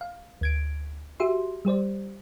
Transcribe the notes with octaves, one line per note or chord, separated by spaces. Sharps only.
F5
D2 G#6 D7
F#4 G4 E5 C6
G3 G4 C5 D5